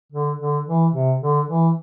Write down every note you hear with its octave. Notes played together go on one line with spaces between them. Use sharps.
D3
D3
E3
C3
D3
E3